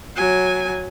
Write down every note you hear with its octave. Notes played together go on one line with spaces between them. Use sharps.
F#3 G#5